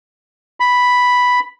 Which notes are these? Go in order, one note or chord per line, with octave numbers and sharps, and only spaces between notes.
B5